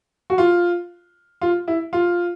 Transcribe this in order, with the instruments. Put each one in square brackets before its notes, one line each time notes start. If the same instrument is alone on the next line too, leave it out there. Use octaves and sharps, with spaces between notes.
[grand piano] F#4
F4
F4
E4
F4